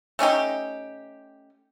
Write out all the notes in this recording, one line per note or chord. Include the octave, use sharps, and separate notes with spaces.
A3 C#4 D#4 G4